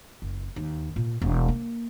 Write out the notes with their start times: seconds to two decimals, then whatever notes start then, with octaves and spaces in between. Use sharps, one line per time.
0.22 F#1
0.56 D#2
0.96 A#2
1.22 E1
1.48 A#3